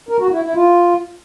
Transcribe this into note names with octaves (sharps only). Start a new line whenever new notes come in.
A#4
F#4
E4
E4
F4